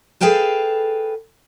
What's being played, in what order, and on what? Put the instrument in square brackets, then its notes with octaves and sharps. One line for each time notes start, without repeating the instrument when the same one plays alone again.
[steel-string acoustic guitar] G#4 A4 B4 F5 G5 A5